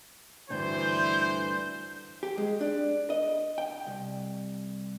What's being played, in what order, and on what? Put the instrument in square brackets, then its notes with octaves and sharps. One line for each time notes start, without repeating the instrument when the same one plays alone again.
[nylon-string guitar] D2 G2 D3 [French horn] E3 [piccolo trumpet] C5 [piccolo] G6
[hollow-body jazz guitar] G4
G#3
D4
D#5
G5
C2